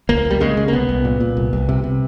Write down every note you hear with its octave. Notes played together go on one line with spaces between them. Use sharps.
C#2 A#3
C#2
G3
C#3 G#3
C#3
A#3
C2 B3
C2
A#2
A#2
C2
C2
C3
C3